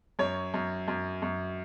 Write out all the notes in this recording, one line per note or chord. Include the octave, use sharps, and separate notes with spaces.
F#2 C#5
F#2
F#2
F#2